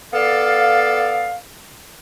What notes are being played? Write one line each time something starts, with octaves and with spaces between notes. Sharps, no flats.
B3 A4 D5 F5